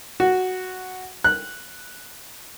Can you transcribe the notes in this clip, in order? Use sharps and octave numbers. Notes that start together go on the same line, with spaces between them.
F#4
F#6